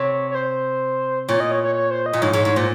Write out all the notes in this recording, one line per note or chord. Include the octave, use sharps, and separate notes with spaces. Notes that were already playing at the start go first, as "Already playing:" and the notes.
Already playing: C3 C#5
C#5
C5
A#2 C#5
D#5
C#5
C#5
C#5
C5
D#5
A#2
G#2 C#5
G#2 C#5
G#2 C#5
A#2 C5